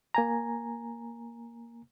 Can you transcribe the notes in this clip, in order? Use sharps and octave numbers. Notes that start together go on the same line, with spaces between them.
A#3 G#5 A#5